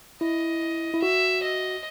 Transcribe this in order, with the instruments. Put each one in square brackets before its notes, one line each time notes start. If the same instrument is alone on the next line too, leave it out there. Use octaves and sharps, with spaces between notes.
[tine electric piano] E4 [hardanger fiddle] D#5
[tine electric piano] E4
[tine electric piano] F#4 [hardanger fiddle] E5
[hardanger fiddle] D#5